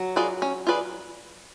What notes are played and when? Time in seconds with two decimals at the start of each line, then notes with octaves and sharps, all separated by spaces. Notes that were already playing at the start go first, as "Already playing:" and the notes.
Already playing: F#3
0.16 F4 G#4 B4 D5
0.42 C#4
0.67 F4 G#4 B4 D5